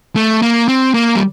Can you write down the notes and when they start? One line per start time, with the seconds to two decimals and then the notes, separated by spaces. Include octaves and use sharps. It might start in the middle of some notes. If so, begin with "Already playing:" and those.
0.16 A3
0.42 A#3
0.68 C4
0.94 A#3
1.16 G3